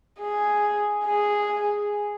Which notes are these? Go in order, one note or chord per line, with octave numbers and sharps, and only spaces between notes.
G#4
G#4